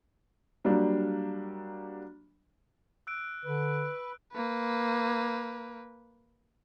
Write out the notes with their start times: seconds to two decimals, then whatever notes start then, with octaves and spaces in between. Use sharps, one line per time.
0.65 F#3 G3 A#3 D4
3.07 E6 F#6 D7
3.45 D3 B4
4.33 A#3 B4